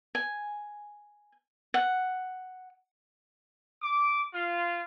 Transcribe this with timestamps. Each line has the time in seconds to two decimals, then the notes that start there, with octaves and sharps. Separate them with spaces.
0.15 G#5
1.74 F#5
3.82 D6
4.34 F4